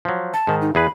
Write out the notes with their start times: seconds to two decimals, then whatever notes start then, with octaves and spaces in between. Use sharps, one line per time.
0.05 F3 F#3
0.34 A5
0.47 G#2 D#3
0.62 D#4
0.75 E2 G#4 B4 B5